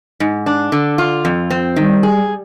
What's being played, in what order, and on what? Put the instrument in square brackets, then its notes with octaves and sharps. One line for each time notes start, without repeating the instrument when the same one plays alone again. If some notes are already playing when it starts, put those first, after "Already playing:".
[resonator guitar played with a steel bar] G#2
D4
D3
F4
F2
C4
[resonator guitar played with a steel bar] D#3 [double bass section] G3
[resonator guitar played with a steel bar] G#4